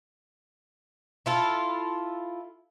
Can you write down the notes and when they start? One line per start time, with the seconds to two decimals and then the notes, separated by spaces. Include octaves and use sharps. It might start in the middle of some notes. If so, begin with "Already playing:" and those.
1.26 E4 F4 A4